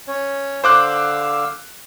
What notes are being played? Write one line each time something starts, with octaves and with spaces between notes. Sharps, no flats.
C#4 C#5
D3 C5 F5 D6 E6 F#6